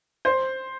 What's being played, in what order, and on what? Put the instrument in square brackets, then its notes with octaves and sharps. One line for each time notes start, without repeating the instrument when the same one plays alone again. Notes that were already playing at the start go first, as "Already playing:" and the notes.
[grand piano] C5